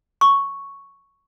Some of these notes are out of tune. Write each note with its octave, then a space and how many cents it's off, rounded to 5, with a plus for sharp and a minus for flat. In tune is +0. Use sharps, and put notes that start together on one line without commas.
C#6 +0